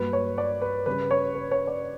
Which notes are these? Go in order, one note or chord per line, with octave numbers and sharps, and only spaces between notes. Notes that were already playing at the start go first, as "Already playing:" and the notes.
Already playing: G2 F#3 A#3 B4
C#5
D5
B4
C#3 G3 C#4 B4
C#5
B4
C#5
D5